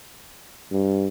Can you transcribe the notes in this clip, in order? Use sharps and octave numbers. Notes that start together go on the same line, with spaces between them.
G2